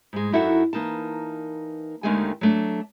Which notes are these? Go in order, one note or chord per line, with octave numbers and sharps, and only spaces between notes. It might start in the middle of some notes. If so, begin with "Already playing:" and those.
G#2 G#3
F#2 D#4 E4 F#4 A4 F#5
E3 A#3 D#4 A#4 A5
D#2 D3 D#3 G#3 A3 G#5
F#3 A3 D4